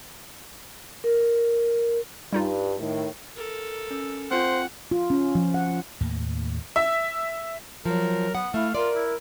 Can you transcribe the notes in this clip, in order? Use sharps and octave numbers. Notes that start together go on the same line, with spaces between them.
A#4
G2 G3 D#4 F4
A2 D#3
A4 A#4
C#4 E6
C4 F4 C5 F#5
F4
C#4
F3
F#5
D#2 A2 A#3
E5
F3 F#3 A#4
B3 F#5
A3 E4 F5
F4 A#4 D5
E4